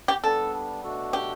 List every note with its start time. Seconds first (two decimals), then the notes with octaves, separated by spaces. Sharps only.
0.08 G4
0.24 G3 B3 D4 A4
0.83 B2 A3 D4 F#4 A4
1.13 G4